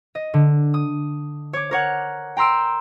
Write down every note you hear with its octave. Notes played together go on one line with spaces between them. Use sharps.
D#5
D3
D#6
C#5 D6
A#4 C#5 F#5
G5 A#5 C6 E6 D7